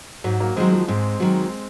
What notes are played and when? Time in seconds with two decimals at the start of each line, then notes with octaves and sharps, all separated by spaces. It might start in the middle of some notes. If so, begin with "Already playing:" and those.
0.24 G#2 F#3
0.40 F#3 A#3
0.56 D#3 F#3 G#3 C4
0.72 F3 G#3
0.88 G#2 G#3 C4
1.20 D#3 F#3